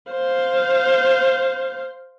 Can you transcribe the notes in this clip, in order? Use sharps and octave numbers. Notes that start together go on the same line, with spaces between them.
C5 F5